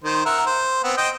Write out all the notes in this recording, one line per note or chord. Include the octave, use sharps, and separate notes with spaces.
D#3 C5
A#4 E5 F#5
C5
B3 C4
C5 D#5 G5